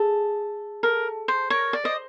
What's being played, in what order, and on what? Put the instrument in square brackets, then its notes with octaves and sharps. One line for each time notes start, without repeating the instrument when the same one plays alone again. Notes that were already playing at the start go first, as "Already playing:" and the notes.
Already playing: [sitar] G#4 [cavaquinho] A4
[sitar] A4 [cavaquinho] A#4
[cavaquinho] C5
[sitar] A#4 [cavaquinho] C#5
[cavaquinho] D5
[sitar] C5 [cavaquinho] D#5